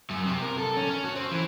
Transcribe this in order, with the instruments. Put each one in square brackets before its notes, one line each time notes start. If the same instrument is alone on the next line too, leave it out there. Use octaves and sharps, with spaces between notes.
[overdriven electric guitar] F#2
C3
A#4
A4
C#4
C#4
F#4
C4
E3